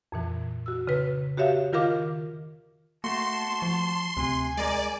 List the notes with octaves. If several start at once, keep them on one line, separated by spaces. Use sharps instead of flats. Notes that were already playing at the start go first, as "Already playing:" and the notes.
F2 A#2 E3
F#4 E6
C#3 B4
F#4 G4 C#5 E5 F5
D#3 F4 A#4 F5 D6 F6
A3 A#3 F#4 A5 C6
F3
D2 C3 G#5
G#3 A#4 D5